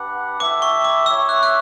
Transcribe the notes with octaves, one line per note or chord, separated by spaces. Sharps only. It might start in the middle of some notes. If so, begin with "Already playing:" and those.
Already playing: D4 G4 B4 F#5
E4 A4 E5 G5 D6
C#6
D6
E4 G4 C#5 E5 E6
F#6
F#6